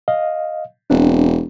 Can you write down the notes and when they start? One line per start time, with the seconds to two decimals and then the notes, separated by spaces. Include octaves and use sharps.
0.08 D#5 F5
0.90 E1 C4 D4